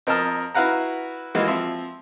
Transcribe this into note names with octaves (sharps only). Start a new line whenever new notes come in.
F2 A#4 D#5 A5 F6
E4 F#4 B4 F5 F#5 A#5
E3 G#3 A#3 F4 F#4
F3 C4 E5